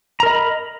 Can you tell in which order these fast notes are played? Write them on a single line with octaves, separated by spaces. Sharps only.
A#5 A#4 D#5 B5